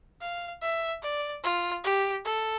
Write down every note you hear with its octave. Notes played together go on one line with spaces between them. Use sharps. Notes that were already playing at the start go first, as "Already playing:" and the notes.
F5
E5
D5
F4
G4
A4